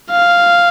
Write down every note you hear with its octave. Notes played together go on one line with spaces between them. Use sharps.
F5